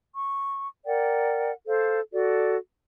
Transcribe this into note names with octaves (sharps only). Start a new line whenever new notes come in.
C#6
A#4 D5 F#5 G5
A4 C5 F5
F#4 A4 D5